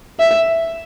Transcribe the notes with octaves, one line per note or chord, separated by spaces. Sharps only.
E5